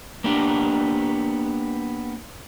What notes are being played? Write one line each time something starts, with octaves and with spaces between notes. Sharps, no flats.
A#3 B3 D4 G4